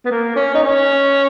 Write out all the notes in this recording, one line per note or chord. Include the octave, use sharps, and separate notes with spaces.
B3
A#3
C#4
D#4
C#4